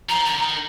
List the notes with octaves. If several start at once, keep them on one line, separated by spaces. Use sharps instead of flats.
F3 A#5
D3 A#5
D3
D#3